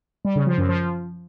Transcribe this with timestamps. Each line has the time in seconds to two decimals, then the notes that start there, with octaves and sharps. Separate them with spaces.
0.25 G3
0.36 C#3
0.47 F3
0.58 F#2
0.69 F3